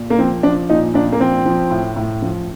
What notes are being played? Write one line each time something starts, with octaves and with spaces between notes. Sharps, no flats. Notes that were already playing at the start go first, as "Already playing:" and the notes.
Already playing: A#2
A#3
F3 C4
F3 D4
A#2 D#4
A#2 D4
A#3
F3 C4
F3
A2
A2
F3